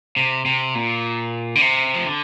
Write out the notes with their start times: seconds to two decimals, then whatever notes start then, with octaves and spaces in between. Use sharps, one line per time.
0.16 C3
0.45 C3
0.75 A#2
1.55 D3
1.61 C3
1.94 F3
2.05 D3